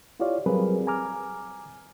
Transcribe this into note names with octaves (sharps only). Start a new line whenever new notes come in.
E4 F4 G4 C#5 D5 F5
F#3 G3 C4 G#4 A#4 B4
G#5 A#5 D6 F6